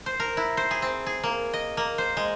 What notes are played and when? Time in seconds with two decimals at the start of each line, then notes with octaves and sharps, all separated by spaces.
0.06 C5
0.20 A#4
0.37 E4
0.57 C5
0.71 G#4
0.82 C4
1.06 G#4
1.23 A#3
1.53 D#5
1.77 A#3
1.98 C5
2.17 G#3